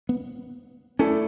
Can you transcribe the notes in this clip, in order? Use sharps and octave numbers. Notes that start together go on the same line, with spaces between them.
B3
A3 C#4 E4 A4 D5